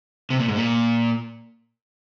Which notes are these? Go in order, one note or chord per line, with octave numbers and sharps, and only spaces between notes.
C3
A#2
G#2
A#2